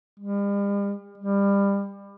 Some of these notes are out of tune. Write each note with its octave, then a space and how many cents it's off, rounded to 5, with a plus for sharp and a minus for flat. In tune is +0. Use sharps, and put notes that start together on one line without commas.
G3 +45
G3 +25